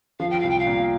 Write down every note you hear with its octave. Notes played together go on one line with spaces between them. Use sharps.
F3 F5
G5
C2 F5
G5
F5
A#2